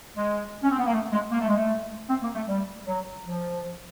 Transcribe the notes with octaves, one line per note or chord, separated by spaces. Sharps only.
G#3
C#4
C4
B3
A#3
A3
G#3
A#3
A3
G#3
A3
C4
A#3
A3
G3
F#3
F3